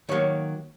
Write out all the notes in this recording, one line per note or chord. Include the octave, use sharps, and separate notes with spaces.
D#3 F#3 A#3 C#5